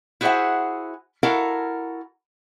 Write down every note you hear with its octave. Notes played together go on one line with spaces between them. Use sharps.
E4 F#4 G#4 C5 E5 F#5
E4 F#4 A4 A#4 F5 F#5